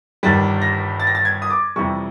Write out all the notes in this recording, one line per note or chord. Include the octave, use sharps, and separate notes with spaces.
G1 G2 D#3 G3 A6
A#6
A6
A#6
A6
G#6
D#6
D6
F2 C3 E3 G3 C#6